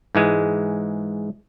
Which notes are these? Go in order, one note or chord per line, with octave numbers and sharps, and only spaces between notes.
G#2 E3 G#3 G#5